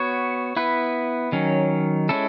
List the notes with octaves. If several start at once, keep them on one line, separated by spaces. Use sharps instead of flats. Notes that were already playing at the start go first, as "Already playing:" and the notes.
Already playing: B3 F#4 C#5
B3 E4 B4
D#3 F#3 C#4
G#3 C#4 E4 A4